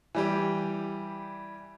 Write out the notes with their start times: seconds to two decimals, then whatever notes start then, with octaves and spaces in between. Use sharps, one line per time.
0.15 E3 G3 G4